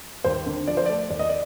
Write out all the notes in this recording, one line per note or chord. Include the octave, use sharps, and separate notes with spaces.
D#2 C5
D3
F3 D5
C5
D5
A3
D#2 D5
D#5
D5